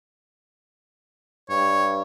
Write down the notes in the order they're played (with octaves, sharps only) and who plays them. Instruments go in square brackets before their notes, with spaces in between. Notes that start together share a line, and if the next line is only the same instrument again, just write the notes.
[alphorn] G2 [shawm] C#5